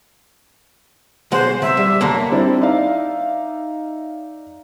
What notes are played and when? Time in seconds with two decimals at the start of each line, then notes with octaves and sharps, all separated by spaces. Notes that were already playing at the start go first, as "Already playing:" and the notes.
1.32 B1 G#3 C5 F#5
1.62 C3 E5
1.77 G3
2.01 F#2 D3 A#3
2.31 G3 C4 D4 E4
2.61 D#4 D5 E5 F5